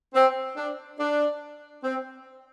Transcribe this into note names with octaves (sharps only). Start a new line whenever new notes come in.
C4
D4
D4
C4